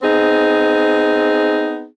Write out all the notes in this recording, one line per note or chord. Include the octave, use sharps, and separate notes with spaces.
B3 C4 D#4 G#4